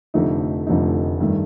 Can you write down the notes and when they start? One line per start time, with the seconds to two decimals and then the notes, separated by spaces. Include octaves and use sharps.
0.14 F1 F2 D3 A3 D#4
0.67 F1 F2 D3 A3 D#4
1.21 G2 D#3 A3